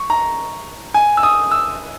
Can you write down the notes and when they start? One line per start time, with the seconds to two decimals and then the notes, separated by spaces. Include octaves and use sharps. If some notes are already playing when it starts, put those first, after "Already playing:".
Already playing: C#6
0.10 A#5
0.94 G#5
1.17 E6
1.23 D#6
1.52 E6